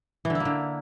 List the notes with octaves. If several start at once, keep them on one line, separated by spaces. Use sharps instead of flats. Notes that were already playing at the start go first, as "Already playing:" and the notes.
E3
D3
E4
A#3
D3